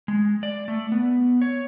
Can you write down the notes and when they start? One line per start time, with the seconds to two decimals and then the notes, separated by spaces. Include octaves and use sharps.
0.08 G#3
0.43 D5
0.68 A3
0.92 B3
1.42 C#5